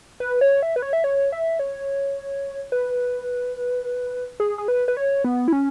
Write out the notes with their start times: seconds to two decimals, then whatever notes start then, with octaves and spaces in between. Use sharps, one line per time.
0.20 B4
0.41 C#5
0.63 E5
0.76 B4
0.82 C#5
0.93 E5
1.04 C#5
1.32 E5
1.59 C#5
2.72 B4
4.40 G#4
4.58 G#4
4.68 B4
4.88 B4
4.97 C#5
5.24 B3
5.48 E4
5.53 C#4